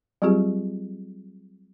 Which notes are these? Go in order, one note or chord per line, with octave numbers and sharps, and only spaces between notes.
F#3 G3 C4 F4 G4 G#4